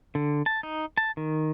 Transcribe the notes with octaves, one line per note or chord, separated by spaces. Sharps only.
D3
A5
D#4
A5
D#3